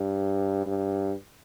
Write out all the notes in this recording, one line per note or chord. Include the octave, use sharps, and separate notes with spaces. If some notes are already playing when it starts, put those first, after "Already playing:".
Already playing: G2
G2